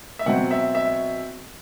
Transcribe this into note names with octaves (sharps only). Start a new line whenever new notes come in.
E5
B2 F#3 C4 F#5
E5
E5